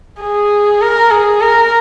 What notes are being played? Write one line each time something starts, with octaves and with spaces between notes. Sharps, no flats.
G#4
A#4
G#4
A#4